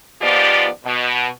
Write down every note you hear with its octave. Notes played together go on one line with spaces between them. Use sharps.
G#2 F3 B3 F4 G4 D5
B2